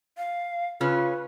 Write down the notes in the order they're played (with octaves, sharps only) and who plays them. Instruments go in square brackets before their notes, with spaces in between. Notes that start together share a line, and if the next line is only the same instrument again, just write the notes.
[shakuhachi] F5
[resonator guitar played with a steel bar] C#3 C#4 [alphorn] F4 [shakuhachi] B4